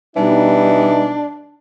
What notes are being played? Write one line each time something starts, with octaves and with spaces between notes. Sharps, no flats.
B2 E3 G3 D4 D#4